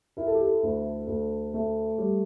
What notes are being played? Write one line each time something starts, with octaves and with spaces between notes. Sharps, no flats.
E4 A#4
A4
G4
A4
D2
D2
A3
G3